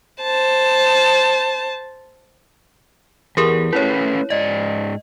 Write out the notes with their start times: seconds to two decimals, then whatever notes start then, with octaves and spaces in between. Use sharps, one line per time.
0.21 C5 A5
3.37 E2 G4 G#4 A#4
3.73 A3 C#4 E4 B4 C#5
4.30 G#2 D5 D#5